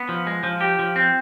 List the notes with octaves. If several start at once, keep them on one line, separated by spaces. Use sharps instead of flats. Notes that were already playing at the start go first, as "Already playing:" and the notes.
Already playing: B3
F3
G#3
F3
G4
F3
C4